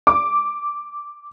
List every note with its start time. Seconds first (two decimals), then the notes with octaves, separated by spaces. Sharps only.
0.07 D6